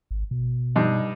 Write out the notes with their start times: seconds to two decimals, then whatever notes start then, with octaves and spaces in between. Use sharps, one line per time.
0.11 G#1
0.31 B2
0.76 G2 D#4